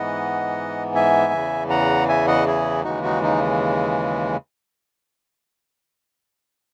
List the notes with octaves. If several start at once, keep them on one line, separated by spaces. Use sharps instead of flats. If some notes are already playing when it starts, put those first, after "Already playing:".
Already playing: G#2 E3 B3 D#5 F#5
E5 G#5
E2 C#3 E3
F#5 A#5
E5 G#5
D#5 F#5
E4 G#4
D#2 C#3 E3 G#3 D#4 F#4
D#4 F#4
D#4